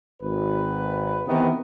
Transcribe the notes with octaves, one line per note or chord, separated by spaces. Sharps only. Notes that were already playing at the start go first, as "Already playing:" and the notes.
G#1 B4
C3 D#3 E3 B3